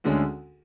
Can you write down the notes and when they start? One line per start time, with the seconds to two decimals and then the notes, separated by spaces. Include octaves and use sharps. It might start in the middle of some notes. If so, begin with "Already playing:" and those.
0.04 D2 D3 G#3 C#4 G#4